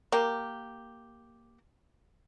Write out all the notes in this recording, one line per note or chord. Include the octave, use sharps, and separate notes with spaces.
A#3 G4